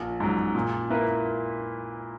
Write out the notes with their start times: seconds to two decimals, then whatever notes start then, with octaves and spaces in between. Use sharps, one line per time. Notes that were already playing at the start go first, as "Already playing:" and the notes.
Already playing: A#1
0.20 G#2 F#3
0.55 A#2
0.90 A#3 E4 B4